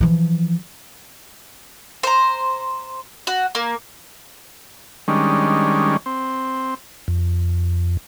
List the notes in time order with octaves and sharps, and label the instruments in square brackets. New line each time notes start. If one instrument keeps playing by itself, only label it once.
[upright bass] E3 F3
[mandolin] C5 A#5
F#4
A#3
[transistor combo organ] D#3 G3 G#3 C#4 D4
C4
[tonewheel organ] F2